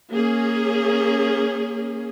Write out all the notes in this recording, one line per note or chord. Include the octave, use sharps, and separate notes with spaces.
A#3 C#4 G#4